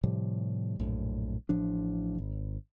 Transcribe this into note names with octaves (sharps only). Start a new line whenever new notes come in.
A2 C3 F3 G3
A#1 F#2 A2
A1 A2 F3 D4
G#1